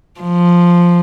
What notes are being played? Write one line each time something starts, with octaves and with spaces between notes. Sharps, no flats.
F3